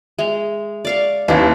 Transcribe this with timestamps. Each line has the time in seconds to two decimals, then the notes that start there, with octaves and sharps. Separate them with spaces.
0.19 G#3 E5 F7
0.85 D5 F5 C#6
1.28 D#2 C#4 D#4 E4 B4 F5 D6